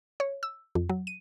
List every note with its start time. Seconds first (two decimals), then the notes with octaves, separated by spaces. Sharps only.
0.20 C#5
0.43 E6
0.75 F2
0.89 F#3
1.07 D#7